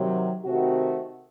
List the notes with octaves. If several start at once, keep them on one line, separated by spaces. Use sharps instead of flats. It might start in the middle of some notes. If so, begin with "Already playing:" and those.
Already playing: C3 D#3 F#3
C3 D#3 A3 C4 F#4